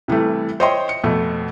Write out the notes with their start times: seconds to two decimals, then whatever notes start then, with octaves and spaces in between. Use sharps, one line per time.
0.08 C3 E3 G3 A3
0.60 C5 C#5 D#5 E5 G5 C6
0.89 C#7
1.04 F2 B2 A3